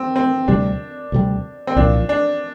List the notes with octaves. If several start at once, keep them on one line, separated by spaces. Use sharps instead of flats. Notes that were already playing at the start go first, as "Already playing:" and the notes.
Already playing: C4
C4
D2 C3 G3 D4
D2 C3 G3
C4
C2 A#2 F3 D4
D4